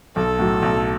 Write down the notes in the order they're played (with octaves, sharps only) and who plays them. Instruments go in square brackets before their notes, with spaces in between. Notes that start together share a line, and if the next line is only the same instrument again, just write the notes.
[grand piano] B1 [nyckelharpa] A4
[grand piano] A2 F#3
B1